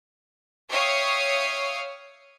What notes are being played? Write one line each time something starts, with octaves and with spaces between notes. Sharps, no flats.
C#5 E5 F5 G5 C#6 D#6